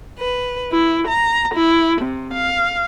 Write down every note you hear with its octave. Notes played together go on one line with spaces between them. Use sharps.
B4
E4
A#5
E4
C3
F5